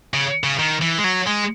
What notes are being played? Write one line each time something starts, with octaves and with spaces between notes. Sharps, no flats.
C#3
C#3
D#3
E3
G#3
F#3
G#3